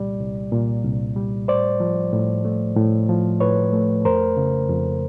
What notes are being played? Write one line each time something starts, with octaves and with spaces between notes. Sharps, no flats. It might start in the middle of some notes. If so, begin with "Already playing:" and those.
Already playing: C2 A#2 G3 D5
C2
A#2
C2
G3
A2 C5 D5
F3
A2
A3
A2
F3
A2 B4 C#5
A3
F2 A#4 C5
C#3
F2